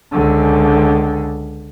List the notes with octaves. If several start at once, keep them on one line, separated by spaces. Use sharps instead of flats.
C#2 D3